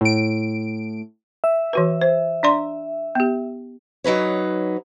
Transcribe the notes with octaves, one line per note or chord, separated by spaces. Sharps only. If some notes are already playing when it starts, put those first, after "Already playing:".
A2 D7
E5
E3 F#4 B4
C5
D4 D5 C6
B3 G4
F#3 D#4 B4 C#5